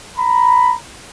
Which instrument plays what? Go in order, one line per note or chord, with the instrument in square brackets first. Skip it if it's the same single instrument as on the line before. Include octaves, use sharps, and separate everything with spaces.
[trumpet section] A#5 B5